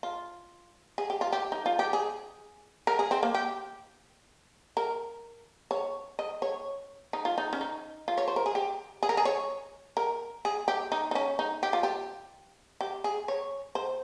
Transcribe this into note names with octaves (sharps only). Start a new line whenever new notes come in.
F4
G#4
G4
F4
G4
D#4
F4
G4
G#4
A#4
G#4
C4
A#3
G4
A#4
C#5
D#5
C#5
D#4
F4
D#4
C#4
D#4
F4
C#5
C5
A#4
G#4
G4
G#4
A#4
G#4
C#5
A#4
G#4
G4
D#4
D#4
C#4
D#4
G4
F4
G4
G4
G#4
C#5
C5